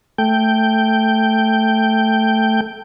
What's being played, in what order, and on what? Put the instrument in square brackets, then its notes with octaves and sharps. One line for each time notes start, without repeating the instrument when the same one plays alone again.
[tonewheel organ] A3 G5